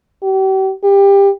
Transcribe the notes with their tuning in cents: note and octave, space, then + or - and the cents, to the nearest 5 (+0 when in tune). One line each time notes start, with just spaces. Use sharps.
G4 -40
G4 +20